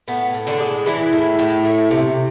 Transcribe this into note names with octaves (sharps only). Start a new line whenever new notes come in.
A2 B3
A2
D3 D4
G#3
E3 G#3 E4
A2
A2
A3
C3